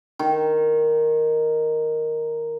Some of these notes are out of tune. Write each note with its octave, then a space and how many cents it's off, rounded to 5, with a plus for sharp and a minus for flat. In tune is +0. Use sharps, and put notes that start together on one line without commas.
D#3 -5 C#6 -40